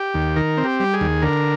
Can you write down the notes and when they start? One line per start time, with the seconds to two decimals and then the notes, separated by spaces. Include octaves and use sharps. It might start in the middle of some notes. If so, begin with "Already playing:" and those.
Already playing: G4
0.14 D#2
0.36 D#3 A#4
0.57 C4
0.65 G4
0.80 G3
0.94 G#4
1.01 D#2
1.22 D3 A#4